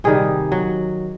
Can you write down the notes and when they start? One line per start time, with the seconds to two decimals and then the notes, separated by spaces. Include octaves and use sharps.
0.04 C3 D#3 G3 G#4
0.52 F#3